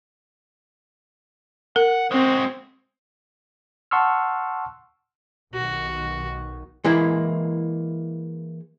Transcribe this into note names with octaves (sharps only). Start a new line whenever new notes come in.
A#4 F#5
G#3 C4 F#4
F#5 A5 C6 C#6 E6 F6
B1 D#3 F#4
E3 G#3 A#3 E4